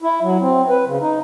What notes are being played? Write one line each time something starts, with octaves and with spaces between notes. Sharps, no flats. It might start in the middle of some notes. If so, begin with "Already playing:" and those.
E4
F#3
C4
B4
C#3
D#4